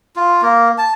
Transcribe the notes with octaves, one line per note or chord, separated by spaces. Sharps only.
F4
A#3
A5